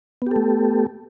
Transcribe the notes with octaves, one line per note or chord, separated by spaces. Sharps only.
A3 B3 G4 A4